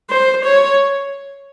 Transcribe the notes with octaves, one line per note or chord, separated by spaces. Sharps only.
C5
C#5